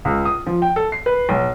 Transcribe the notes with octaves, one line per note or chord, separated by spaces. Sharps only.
C#2
D#6
F3
G5
A4
C7
B4
B1